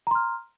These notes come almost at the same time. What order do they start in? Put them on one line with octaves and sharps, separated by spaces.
A#5 C6 F6